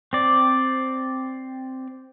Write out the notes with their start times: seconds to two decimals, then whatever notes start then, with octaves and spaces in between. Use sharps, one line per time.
0.13 C4 D5